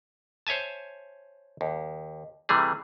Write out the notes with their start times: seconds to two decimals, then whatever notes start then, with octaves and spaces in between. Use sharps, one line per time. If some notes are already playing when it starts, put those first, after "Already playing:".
0.47 C5 C#5 E5 G#5 A5
1.61 D#2
2.49 C3 E3 G3 A3 G#4